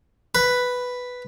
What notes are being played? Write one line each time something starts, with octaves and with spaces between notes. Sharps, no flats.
B4